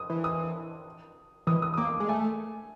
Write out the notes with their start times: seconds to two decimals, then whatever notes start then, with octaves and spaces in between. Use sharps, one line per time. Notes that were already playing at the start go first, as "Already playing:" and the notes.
Already playing: D#6
0.10 E3
0.24 D#6
1.47 E3 D#6
1.62 D#6
1.74 D#6
1.77 A#3 D6
2.00 G#3
2.09 A3 G#5